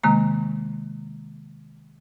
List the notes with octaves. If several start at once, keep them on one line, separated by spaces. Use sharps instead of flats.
C3 D#3 G#3 A#3 A#5